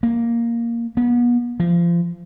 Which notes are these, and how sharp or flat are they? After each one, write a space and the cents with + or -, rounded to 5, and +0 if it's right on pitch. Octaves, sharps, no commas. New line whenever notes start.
A#3 +0
B3 -35
F3 -30